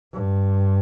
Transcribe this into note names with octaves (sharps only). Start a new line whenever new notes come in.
G2